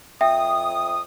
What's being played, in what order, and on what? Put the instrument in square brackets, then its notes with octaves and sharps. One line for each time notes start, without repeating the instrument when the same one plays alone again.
[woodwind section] F2 D#6 [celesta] E5 G5